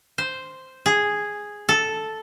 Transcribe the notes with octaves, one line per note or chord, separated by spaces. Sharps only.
C5
G#4
A4